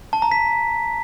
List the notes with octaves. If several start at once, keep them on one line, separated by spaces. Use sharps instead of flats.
A5
A#5
B6